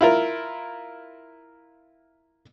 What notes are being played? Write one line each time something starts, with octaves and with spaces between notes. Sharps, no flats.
E4 F4 A#4